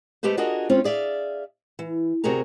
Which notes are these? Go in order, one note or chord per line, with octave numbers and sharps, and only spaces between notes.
G#3 A3 G4 A4 B4 C5
D4 F4 F#4 G#4 A#4 D#5
G#3 C4 C#4 F4
G#4 D5 E5 F5
E3
D2 C3 F#4 G#4 A#4 A#5